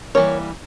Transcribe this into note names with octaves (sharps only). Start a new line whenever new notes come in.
E3 G3 A#3 A#4 C#5